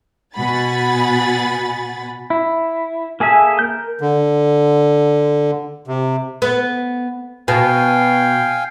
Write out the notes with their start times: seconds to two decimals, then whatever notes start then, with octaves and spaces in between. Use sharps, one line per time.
0.34 B2 F#5 G#5 B5 A6
2.30 E4
3.20 A#3 G#4 A4 E5 G#5
3.59 A#4 G6
4.01 D3
5.87 C3
6.42 B3
7.48 B2 F5 G5 G#5